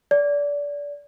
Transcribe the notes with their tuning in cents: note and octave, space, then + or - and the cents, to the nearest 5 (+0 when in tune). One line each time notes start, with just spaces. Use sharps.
D5 -25